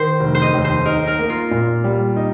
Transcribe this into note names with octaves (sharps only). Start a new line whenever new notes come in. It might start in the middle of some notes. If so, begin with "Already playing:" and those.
Already playing: D#3 C5
F1
C5
D#5
D#2
C5
D#4 A#4
A#4
A#3
F4
A#2
G3
D#4